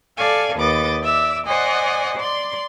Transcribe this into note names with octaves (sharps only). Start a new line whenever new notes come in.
A4 D5 F5 G#5
D#2 B4 D#5 D6 A6
D5 E5 D6 E6
C5 D5 D#5 F#5 G#5
D5 C6